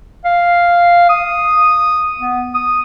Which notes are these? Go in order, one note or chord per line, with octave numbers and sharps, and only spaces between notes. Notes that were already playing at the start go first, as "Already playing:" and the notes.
F5
D#6
B3
D#6